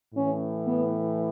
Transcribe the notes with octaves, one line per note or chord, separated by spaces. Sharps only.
A2 E3 C#4
B3